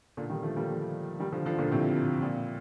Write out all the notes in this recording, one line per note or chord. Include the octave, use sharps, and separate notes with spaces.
A#2 D3
D#3 G3
F3 A3
G3 A#3
D#3 G3
D3 F3
D3 F3
A#2 D3
A2 C3
A#2